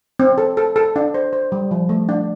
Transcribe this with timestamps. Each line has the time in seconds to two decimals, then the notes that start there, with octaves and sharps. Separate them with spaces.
0.19 C4
0.38 A4
0.57 A4
0.76 A4
0.96 D4
1.14 C5
1.33 C5
1.52 G3
1.71 F3
1.89 A3
2.09 D4